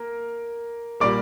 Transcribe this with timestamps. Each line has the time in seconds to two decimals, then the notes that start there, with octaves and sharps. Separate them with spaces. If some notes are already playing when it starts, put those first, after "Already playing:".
Already playing: A#3 A#4
1.00 A#2 G3 A#3 D5 D6